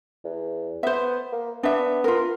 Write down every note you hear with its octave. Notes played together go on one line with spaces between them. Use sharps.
E2
B3 C5 E5
A#3
B3 D4 E5
F4 A#4